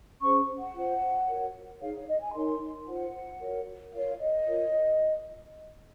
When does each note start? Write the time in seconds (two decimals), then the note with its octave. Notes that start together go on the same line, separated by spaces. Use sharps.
0.21 C#4 G#4 C5 C#6
0.57 F#5
0.74 F4 C5
1.28 F#4 A#4 C#5
1.81 D#4 G#4 C#5 F5
1.94 C#5
2.08 D#5
2.21 G#5
2.34 D#4 A#4 C#5 C6
2.87 F4 C5 F#5
3.40 F#4 A#4 C#5
3.94 F4 A#4 C#5 F5
4.20 D#5
4.47 F4 A#4 C#5